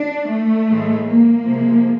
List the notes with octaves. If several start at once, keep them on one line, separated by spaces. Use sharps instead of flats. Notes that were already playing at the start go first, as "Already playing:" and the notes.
Already playing: D4
A3
A2 E3 G#3
A#3
C3 F3 G#3